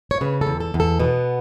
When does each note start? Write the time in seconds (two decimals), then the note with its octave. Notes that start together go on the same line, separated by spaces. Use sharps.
0.11 C#5
0.21 C#3 B4
0.41 A4
0.47 E2
0.60 A4
0.74 E2
0.80 A4
1.00 B2 B3